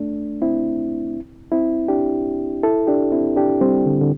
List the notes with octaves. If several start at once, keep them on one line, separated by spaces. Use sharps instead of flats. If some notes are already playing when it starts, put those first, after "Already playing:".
Already playing: A3 D4
C4 E4
C4 E4
D4 G4
E4 A4
D4 G4
C4 E4
D4 G4
G3 C4
D3
D3